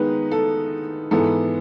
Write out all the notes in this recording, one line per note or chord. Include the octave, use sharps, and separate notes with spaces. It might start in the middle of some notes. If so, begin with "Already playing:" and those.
Already playing: D#3 G#3 B3 D#4 B4
A4
G#2 E3 B3 A4